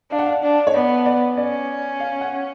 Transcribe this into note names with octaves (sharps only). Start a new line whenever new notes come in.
D4 F5
F#5
F5
D4
C#5
B3 D5
D5
C#4 D5
F5
F#5